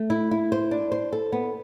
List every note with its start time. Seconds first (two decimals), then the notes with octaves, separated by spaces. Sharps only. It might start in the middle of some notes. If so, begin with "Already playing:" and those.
Already playing: A3
0.10 E4
0.31 E4
0.52 C5
0.71 D4
0.92 C5
1.12 A4
1.32 B3